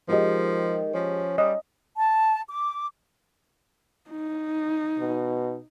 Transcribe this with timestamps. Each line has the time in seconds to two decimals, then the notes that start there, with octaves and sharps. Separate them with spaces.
0.08 D#3 F3 G#3 G4 D#5
0.94 F3 C#4
1.38 G3 D#5
1.96 A5
2.48 D6
4.10 D#4
4.99 B2